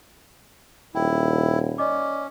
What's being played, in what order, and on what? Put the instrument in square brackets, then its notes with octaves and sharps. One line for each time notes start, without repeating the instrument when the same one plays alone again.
[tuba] D#1 [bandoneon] E4 [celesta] G5
[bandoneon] C#4 [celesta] D5 D#5 D6